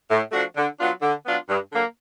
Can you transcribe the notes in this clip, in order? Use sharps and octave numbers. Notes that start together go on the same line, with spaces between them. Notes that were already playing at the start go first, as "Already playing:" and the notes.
A2
F3 A3 D4 F#4
D3
F#3 B3 D4 F4
D3
F#3 B3 D4 F4
G2
D3 F#3 A#3